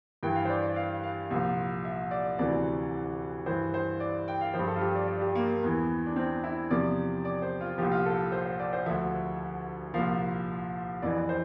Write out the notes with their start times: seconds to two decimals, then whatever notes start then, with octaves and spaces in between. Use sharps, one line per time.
0.23 G2 E3 G5
0.36 F5
0.45 C5
0.50 D5
0.62 D5
0.76 F5
1.03 F5
1.30 C2 A#2 F3
1.85 E5
2.11 D5
2.39 D2 C3 E3 D5
3.46 G2 E3 C5
3.74 C5
4.00 D5
4.28 G5
4.41 F5
4.54 F3 C5
4.59 G2
4.68 A4
4.76 F4
4.81 G4
4.95 D5
5.08 D5
5.21 G4
5.35 A#3
5.63 E2 E3
6.06 D4
6.16 C4
6.44 E4
6.70 E2 C3 F3 D5
7.25 D5
7.42 C5
7.61 F4
7.78 C2 A#2 F3 G4
7.92 F4
8.06 A4
8.32 C5
8.46 C5
8.59 D5
8.73 C5
8.86 D2 D3 F3 E5
9.94 C2 A#2 F3 F5
11.02 F2 E3 D5
11.29 C5